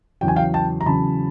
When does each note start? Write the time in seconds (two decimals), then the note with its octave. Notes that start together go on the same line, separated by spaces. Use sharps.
0.21 E2 C#3 F#3 G5
0.28 G#5
0.36 F5 G5
0.54 G5 A5
0.81 A#5
0.86 E2 C#3 F#3 A5 B5